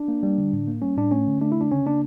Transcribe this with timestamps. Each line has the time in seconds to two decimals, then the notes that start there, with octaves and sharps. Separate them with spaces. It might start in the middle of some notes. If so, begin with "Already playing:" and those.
Already playing: D4
0.08 A#3
0.23 G3
0.38 D3
0.53 A2
0.67 A#3
0.82 G3 C#4
0.98 A2 D4
1.11 A3 C#4
1.27 D3
1.41 A3 D4
1.52 E4
1.56 D3 D4
1.72 C#3 C#4
1.86 A#3 D4